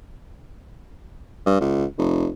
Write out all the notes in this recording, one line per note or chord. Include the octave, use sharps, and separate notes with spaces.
G2
C#2
F1